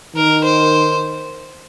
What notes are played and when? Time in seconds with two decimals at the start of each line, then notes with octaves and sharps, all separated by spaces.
0.16 D#3 A#4
0.44 C5